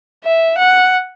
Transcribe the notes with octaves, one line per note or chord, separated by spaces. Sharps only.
E5
F#5